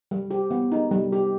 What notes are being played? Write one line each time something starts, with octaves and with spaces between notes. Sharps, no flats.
G3
G4
B3
D#4
G3
G4